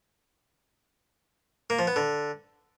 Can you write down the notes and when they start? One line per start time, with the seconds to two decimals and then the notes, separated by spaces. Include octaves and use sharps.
1.70 A#3
1.79 F3
1.87 B3
1.96 D3